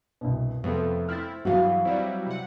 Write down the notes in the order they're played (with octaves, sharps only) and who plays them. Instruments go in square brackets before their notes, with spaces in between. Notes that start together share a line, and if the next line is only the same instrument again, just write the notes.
[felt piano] C2 G2 B2
[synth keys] F2 [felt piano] C3 B3 A4 [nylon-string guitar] A3
[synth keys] C4 E4 [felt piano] F6 A6
[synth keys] G2 E3 B3 [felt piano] F#3 [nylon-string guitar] F#4 F5
[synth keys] F#3 G3 E4 [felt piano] C4 D5
[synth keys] C3 F#5